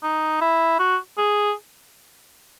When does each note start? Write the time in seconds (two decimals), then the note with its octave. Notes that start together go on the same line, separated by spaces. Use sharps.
0.03 D#4
0.41 E4
0.79 F#4
1.18 G#4